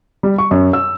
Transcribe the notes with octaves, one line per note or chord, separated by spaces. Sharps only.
G3
C#6
F#2
E6